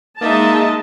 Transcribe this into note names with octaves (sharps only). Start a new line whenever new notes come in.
G#3 A#3 D#4 D#5 E5 A5